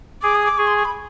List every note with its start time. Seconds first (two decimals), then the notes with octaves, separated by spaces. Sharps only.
0.22 G#4 D6
0.35 D#6
0.46 D6
0.58 G#4 C#6
0.67 C6
0.76 C#6
0.85 B5